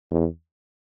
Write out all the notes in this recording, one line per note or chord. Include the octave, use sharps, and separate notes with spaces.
E2